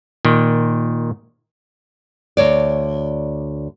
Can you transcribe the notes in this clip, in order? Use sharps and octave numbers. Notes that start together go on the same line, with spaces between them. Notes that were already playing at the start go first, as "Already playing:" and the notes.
A#2 D#3
D2 C#5 D5